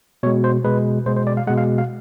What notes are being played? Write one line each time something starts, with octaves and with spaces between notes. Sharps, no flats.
B2 G#3 C#5
C5
B2 G#3 B4
B2 G#3 C5
C5
D5
F5
B2 G#3 F#5
F5
F5